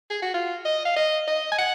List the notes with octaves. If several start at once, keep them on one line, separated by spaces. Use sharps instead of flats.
G#4
F#4
F4
D#5
F5
D#5
D#5
G#5
F#5